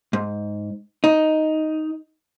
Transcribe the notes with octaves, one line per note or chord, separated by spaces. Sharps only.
G#2
D#4